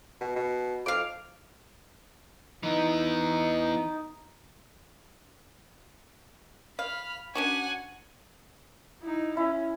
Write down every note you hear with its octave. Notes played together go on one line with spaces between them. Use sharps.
B2
B2
F2 F5 D6
E3 B3 D#4
F5 B5 F6
C#4 D4 F#4 F#5 G#5
D#4 E4
C#4 E4